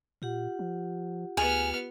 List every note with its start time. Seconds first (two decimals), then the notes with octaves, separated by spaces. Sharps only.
0.22 A#2 F4 G4 F#5
0.59 F3
1.37 D2 B3 G#4 F6